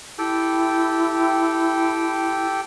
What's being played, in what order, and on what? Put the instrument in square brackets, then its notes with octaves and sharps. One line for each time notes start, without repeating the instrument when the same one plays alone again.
[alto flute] E4 [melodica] G4 A4 G5